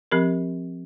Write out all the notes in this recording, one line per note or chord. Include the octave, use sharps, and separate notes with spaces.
F3 C4 G4 A#4